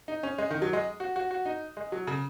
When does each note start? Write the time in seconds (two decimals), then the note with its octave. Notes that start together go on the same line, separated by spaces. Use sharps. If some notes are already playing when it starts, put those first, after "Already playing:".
0.08 D#4
0.23 C#4
0.38 G#3
0.50 D#3
0.62 F#3
0.73 G#3
1.00 F#4
1.16 F#4
1.31 F#4
1.46 D#4
1.77 G#3
1.92 F#3
2.07 C#3